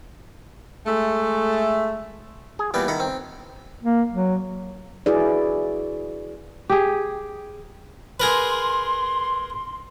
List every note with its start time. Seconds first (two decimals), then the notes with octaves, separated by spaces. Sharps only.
0.86 G#3 A3
2.59 G#4
2.74 A#2 E3 G3 B3 D5
2.88 D#3 E4 A4 F#5
3.00 C4
3.83 A#3
4.12 F#3
5.06 E4 F#4 G#4 B4 D5
6.70 G4 G#4
8.20 G#4 A#4 B4 C6